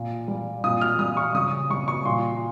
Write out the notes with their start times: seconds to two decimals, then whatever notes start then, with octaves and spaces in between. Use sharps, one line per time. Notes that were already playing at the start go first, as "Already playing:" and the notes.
Already playing: A#2
0.28 G3
0.64 A#2 D#6
0.81 F6
0.99 G3 D#6
1.17 C#6
1.34 C#3 D#6
1.70 G3 C#6
1.88 C#6
2.05 A#2 C6